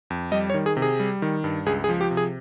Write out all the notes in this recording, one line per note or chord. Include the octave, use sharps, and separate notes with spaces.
F2
G3 D#5
C#5
D#3
G#4
C3
G#4
G3
D#3
G2
C#2 G#4
G#4
F3
G4
C3
G#4